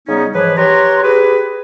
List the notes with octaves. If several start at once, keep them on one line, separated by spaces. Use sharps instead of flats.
C#3 G3 B3 C#4 D#4
G#2 E3 F3 B4 C#5
G4 B4 C#5 A#5 C6
G4 G#4 B4